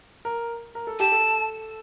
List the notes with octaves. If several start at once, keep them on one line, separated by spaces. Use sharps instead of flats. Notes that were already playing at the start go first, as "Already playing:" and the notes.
A#4
A#4
A4
G4 A5
A4